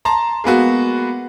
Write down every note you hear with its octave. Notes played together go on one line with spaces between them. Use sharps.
A5 A#5 C6
G#3 A#3 B3 F#4